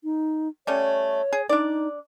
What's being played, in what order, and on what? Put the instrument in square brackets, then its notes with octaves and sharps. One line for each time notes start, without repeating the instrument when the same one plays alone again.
[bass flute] D#4
[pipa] G3 A3 C#4 [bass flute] C#5
[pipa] G#4
[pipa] D4 D5 [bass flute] D#4